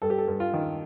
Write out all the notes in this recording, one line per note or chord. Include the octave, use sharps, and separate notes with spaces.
G2 A4
G4
A4
G2
F4
D#3